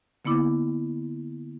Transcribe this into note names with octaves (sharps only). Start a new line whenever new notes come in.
D3 A#3 B3 E4 D6